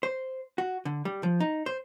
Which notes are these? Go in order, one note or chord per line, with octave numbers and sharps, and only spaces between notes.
C5
F#4
D3
G3
F3
D#4
C5